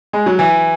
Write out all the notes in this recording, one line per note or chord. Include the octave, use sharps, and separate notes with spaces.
G#3
F#3
E3